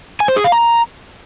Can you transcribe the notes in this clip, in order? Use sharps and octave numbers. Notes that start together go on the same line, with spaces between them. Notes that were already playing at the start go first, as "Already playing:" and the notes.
G#5
C5
G#4
F5
A#5